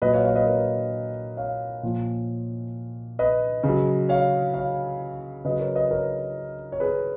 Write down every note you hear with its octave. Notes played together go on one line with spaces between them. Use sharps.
A#2 F#3 B4 D#5
C#5 F5
C#5 F5
B4 D#5
A#4 C#5
C#5 F5
A#2 F3
B4 D#5
C#3
F#3
C#5 F5
C#5 F5
C#3 F#3 B4 D#5
A#4 C#5
B4 D#5
A#4 C#5
C#5
G#4 B4